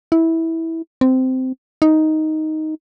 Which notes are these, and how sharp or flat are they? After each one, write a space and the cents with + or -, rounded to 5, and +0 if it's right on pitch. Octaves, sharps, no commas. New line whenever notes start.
E4 -15
C4 -15
D#4 +5